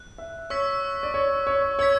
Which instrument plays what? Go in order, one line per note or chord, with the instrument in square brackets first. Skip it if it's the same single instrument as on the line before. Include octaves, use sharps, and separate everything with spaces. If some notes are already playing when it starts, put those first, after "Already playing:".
Already playing: [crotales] F#6
[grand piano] E5
[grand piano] C#5 [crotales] C#6 E6 B6
[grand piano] D5
C#5
C#5
[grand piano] C#5 [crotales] E6 G#6 B6